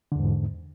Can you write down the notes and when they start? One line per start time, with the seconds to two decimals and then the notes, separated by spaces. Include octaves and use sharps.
0.12 D3
0.16 E2
0.20 G#2